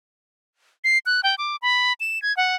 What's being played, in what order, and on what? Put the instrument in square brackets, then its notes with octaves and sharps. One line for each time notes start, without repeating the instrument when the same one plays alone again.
[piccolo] C7
F#6
G5
D6
B5
E7
G#6
F#5